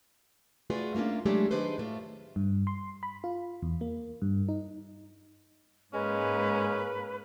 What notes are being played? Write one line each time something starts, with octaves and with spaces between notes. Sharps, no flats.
A3 F4 F#4 G#4 B4 D5
A3 A#3 C#4 D4 F4
F#3 G#3 A3 D4 G4 G#4
D#3 D4 D#4 G#4 B4 C5
A2 A3 F4
G2
C6
B5
F4
E2
A#3
G2
D#4
G#2 G#3 A#3 C#4 B4